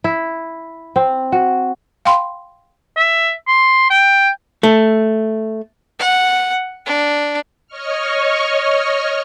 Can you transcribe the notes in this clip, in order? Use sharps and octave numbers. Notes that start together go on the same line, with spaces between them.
E4
C4
F#4
F5 G5 B5 C6
E5
C6
G5
A3
F#5
D4
C#5 D#5 C#6 F6